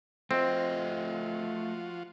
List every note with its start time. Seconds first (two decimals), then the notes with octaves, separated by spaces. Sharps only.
0.31 F3 A3 C4 F4 F#4 D#5